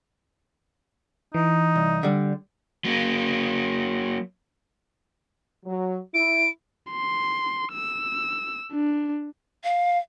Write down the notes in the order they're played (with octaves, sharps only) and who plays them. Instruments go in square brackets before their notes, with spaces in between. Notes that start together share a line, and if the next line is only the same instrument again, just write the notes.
[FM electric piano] E3 [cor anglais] D#4
[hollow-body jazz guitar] C2
D3 G3
[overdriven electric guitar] F#3 A#3
[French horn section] F#3
[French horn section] E4 [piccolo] D7
[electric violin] C6
E6
D4
[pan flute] F5